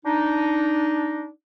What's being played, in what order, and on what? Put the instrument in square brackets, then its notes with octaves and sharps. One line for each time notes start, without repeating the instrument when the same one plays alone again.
[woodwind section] D4 D#4